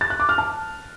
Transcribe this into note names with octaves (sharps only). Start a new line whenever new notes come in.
A6
F#6
D6
F6
A5